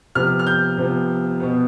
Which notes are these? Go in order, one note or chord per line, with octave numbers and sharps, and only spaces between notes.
C3 F3 B3 F6
F6
G6
C3 F3 B3
B2 B3